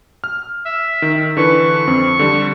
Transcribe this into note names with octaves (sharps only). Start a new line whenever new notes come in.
F6
E5
D#3
D3 E3 B4 C#6
F2 C4
D3 G3